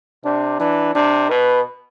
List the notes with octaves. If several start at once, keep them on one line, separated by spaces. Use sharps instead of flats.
C3 D4
E3 D4
C3 D4
B2 B4